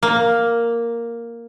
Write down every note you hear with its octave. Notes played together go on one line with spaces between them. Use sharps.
A#3